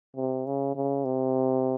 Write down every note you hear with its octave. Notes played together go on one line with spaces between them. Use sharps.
C3
C#3
C#3
C3